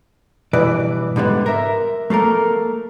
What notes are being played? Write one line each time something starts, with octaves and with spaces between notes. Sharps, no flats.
G2 B2 E3 B4 D5
G#2 D3 G3 B3
A#4 E5
A3 A#3 A4 A#4